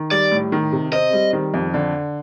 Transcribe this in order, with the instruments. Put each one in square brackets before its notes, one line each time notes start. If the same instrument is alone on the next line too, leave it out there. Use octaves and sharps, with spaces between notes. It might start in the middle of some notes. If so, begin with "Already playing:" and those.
Already playing: [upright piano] D#3
[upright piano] G3 [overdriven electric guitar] D5
[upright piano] A2
D#3
C3
[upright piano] C4 [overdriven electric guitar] D#5
[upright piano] G3
D#3
F2
D3